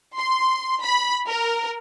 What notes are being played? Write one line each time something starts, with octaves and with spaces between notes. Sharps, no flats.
C6
B5
A#4